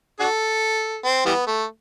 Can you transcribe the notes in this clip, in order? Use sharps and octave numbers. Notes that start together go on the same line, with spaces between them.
D4 F#4 A4
C4
E3 G3 B3
A3